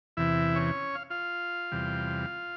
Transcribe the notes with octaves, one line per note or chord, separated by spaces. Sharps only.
E2 C3 E3 E4 E5
C#4 C#5
F5
F4 F5
E2 C3 G3